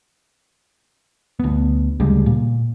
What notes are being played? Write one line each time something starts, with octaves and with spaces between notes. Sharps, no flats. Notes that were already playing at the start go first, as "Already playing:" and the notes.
D2 B3
D2 C#3 G3 G#3
A#2